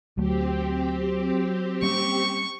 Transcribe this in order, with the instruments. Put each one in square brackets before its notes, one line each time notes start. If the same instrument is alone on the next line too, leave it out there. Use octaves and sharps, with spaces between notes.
[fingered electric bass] D2 A3 [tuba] F#3 [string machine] C4 G4
[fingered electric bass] G3 A#3 C#4 [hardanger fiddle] C#6